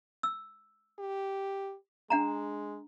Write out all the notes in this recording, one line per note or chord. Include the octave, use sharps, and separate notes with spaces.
E6
G4
G#3 D4 F#5 A#5